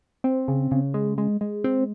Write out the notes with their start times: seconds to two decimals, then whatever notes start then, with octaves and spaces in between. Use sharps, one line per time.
0.24 C4
0.48 C#3
0.71 C#3
0.94 G#3
1.18 G#3
1.41 G#3
1.64 C4